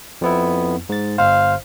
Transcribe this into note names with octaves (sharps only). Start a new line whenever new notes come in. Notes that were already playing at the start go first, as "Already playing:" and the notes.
F2 B3 E4
G#2 A6
G1 C5 F5